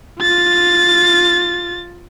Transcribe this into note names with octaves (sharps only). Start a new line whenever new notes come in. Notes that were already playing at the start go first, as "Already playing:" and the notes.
F4 A6